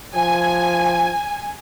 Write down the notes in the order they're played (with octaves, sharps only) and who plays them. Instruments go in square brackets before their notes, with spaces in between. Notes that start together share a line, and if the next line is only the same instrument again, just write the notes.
[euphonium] F3 [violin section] G#5